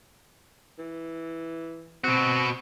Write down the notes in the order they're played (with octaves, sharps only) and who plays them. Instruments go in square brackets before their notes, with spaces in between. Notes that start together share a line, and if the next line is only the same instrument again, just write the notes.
[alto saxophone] E3
[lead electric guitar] B2 F#4 [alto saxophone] C4